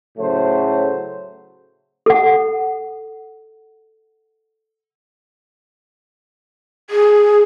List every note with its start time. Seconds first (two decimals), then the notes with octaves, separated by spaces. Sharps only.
0.18 A2 C#3 F#3 A3 C5
2.06 A4 F#5
6.90 G#4